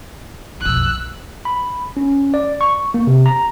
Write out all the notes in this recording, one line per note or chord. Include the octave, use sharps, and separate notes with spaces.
B1 F2 E6 F#6
B5
C#4
D5
C#6
A#3
C3
A#5